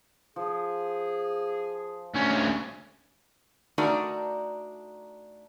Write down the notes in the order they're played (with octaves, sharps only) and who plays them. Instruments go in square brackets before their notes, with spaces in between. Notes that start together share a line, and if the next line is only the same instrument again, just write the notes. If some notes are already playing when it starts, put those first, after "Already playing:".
[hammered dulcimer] F3 [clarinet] G#4
[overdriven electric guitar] D2 C#4
[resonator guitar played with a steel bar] A3 D4 D#4 F#4 A#4 D5